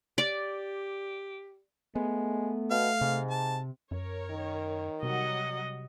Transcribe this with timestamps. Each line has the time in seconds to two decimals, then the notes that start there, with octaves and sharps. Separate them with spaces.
0.18 G4 D5
1.96 G#3 A3 B3
2.71 B2 F5
3.01 G#2 C3
3.30 A5
3.91 F#2 A#4 C#5
4.31 D#3
5.03 C3 F#3 G3 D#5 F#5